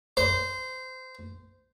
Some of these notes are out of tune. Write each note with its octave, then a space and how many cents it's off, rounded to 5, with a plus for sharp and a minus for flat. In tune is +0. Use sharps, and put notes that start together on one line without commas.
C5 -20